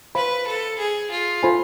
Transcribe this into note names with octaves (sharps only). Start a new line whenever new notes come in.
B4 C5 F5 B5
A4
G#4
F4
F4 A4 C5 G#5 B5